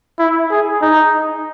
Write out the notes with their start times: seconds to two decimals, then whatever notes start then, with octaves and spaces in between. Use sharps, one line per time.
0.19 E4
0.51 G#4
0.82 D#4